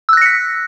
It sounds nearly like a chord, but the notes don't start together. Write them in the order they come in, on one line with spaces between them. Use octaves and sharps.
E6 F#6 A#6 C#7 B6